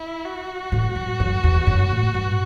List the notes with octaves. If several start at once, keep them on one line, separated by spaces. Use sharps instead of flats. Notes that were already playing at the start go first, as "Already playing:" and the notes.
Already playing: E4
F#4
A2
F#2
F#2
E2
F#2
A2
G2